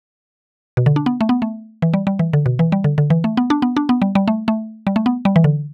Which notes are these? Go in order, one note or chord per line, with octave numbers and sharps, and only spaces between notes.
B2
D3
D4
B3
A3
B3
A3
E3
G3
G3
E3
D3
B2
E3
G3
D3
D3
E3
A3
B3
D4
B3
D4
B3
G3
G3
A3
A3
G3
A3
B3
G3
E3
D3